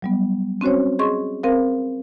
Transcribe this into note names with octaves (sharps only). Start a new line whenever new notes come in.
F#3 G3 B3
C4 C#4 F#4 C5 C#5
G#4 D#5 C6 C#6
C4 A#4 C5 F5